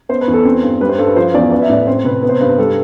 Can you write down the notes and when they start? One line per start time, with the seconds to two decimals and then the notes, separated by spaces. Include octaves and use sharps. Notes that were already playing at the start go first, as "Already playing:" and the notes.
0.09 B3 C5
0.21 B4
0.28 E2
0.33 A4
0.45 C4
0.63 G2
0.81 G3 B4
0.89 C5
0.98 G2 A4
1.07 B4
1.16 F3 C5
1.34 E2 D5
1.51 B3 D5
1.62 E5
1.69 A2 D5
1.87 C4 C5
2.05 C3 B4
2.23 B3
2.29 C5
2.41 G2 B4
2.58 G3 A4